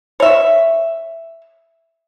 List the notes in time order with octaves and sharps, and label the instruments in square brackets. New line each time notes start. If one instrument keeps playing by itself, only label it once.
[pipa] C#5 E5